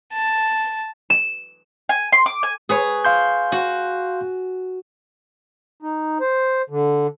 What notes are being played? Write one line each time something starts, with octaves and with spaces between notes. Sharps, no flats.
A5
E7
G#5
C6
D6
G#5
G#4 B4 C#5
F5 C6 G6
F#4
D#4
C5
D3